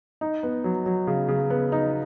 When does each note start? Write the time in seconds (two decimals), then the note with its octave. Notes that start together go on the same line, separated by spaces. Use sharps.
0.21 D#4
0.43 B3
0.64 F#3
0.86 F#3
1.07 C#3
1.28 C#3
1.50 B3
1.72 D#4